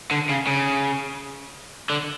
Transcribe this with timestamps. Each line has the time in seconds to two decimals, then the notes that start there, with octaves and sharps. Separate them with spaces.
0.11 D3
0.29 C#3
0.47 C#3
1.90 D3